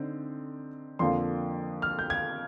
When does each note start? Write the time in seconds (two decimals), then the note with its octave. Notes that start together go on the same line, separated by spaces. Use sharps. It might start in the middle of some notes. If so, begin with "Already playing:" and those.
Already playing: D3 C4 D#4
0.99 F2 D3 F3 A#3 C6
1.82 F6
1.99 G6
2.10 G#6